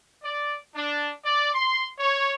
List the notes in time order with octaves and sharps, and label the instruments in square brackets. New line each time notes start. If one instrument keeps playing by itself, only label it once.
[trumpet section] D5
D4
D5
C6
C#5